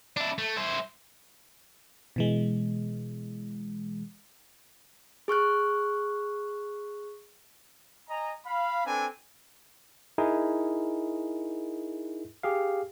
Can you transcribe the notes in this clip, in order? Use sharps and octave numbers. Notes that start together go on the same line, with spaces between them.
D4 E4
A3
E4 C5
B2 E3 G#3
G#4 C#6 F6 F#6
D#5 G#5 A#5
F5 B5
C4 D4 A4 B4 G#5
D#4 E4 G#4 A#4
G4 G#4 F5